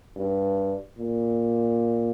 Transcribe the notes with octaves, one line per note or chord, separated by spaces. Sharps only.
G2
A#2